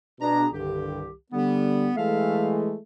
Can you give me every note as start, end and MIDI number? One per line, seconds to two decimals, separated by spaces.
0.20 0.46 47
0.20 0.46 62
0.20 0.46 68
0.20 0.46 82
0.52 1.12 36
0.52 1.03 43
0.52 1.03 50
0.52 1.12 51
0.52 1.12 67
1.32 1.90 50
1.32 1.90 55
1.32 1.95 59
1.96 2.76 52
1.96 2.76 56
1.96 2.76 57
1.96 2.52 69
1.96 2.52 76
1.96 2.52 77